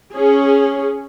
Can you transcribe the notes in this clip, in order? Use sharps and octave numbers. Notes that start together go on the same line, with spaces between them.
C#4 G#4